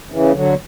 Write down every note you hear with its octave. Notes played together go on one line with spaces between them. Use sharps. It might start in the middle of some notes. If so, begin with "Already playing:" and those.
C#3 E3
D3 F#3